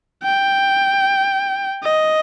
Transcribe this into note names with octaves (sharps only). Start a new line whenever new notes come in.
G5
D#5